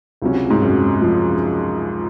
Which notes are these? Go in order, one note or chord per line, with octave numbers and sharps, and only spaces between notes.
C#2 C3 F#3 C#4
G#2
F#2
F3